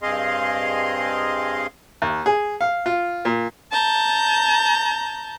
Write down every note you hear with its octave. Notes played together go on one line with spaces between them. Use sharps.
G2 C4 G#4 D#5 F5 C6
D#2
G#4
F5
F4
A#2
A5 A#5 G6